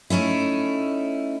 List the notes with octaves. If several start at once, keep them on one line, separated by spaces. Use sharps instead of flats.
A3 C#4 D#4 E4